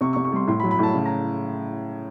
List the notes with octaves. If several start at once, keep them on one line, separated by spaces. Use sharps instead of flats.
C3 C#6
C#6
C3
C#6
G3 C6
A2 C6
B5
F#3
B5
A2 A5
C#3
A#5